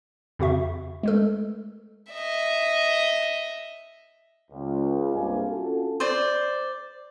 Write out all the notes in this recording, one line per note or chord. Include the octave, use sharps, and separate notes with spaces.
F2 C#3 F#4 E5
G#3 A3 A4
D#5 E5
C#2
G2 C3 A#3 G#4 G#5
C#4 F4 F#4 A4
C5 D5